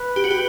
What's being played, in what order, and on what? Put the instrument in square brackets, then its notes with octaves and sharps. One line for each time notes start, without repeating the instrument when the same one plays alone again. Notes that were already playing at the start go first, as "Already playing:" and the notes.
Already playing: [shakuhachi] B4
[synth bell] G4
F#4
G4